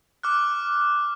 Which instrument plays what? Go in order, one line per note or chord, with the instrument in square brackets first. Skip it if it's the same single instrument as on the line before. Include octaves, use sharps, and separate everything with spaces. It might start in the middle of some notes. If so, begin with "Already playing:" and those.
[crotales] D6 F6 F#6